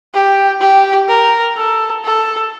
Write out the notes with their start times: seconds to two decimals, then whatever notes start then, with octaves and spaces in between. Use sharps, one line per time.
0.14 G4
0.61 G4
1.08 A#4
1.57 A4
2.05 A4